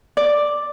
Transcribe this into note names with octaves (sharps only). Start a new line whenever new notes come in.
D5